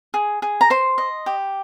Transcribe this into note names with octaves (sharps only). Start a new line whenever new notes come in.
G#4
G#4
A#5
C5 C6
D#5
G4